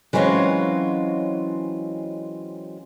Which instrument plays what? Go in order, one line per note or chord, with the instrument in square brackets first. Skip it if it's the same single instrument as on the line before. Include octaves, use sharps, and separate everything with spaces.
[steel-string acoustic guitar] E3 F#3 G#3 C4 C#4 F4